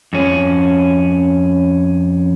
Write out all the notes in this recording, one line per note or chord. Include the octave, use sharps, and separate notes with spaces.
F2 C#4